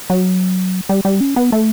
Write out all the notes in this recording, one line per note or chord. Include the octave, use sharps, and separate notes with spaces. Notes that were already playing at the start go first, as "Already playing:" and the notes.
F#3
G3
G3
C#4
B3
A3